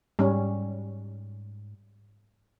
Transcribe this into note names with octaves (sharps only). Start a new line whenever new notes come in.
G#2 G3 C#4